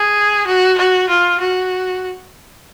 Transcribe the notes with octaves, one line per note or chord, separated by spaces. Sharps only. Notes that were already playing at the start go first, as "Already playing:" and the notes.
Already playing: G#4
F#4
F#4
F4
F#4